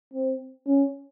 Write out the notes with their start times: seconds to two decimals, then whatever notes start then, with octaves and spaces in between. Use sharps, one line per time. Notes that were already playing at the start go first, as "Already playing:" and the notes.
0.14 C4
0.67 C#4